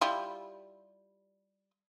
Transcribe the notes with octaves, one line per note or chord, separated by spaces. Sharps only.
G3 E4 F4